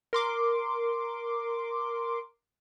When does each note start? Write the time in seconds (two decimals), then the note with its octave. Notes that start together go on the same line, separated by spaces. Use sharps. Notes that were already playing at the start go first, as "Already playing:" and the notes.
0.13 A#4 C6 D6